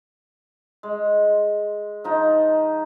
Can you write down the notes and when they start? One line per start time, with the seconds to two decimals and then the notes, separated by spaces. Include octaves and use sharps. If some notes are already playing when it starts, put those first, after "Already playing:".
0.83 G#3
2.04 F3 D#4